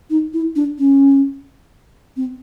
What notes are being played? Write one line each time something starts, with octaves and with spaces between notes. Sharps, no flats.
D#4
E4
D4
C#4
C4